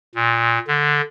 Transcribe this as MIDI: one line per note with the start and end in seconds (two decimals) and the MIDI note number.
0.15 0.59 46
0.68 1.01 50